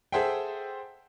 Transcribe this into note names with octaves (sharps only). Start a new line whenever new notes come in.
G#4 A4 C5 E5 F#5 G5